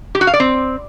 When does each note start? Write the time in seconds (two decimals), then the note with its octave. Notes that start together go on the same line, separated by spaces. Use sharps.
0.15 G4
0.21 F#4
0.27 F5
0.33 D5
0.40 C4